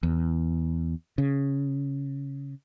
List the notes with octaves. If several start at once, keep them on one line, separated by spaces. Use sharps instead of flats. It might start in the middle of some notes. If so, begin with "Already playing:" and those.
E2
C#3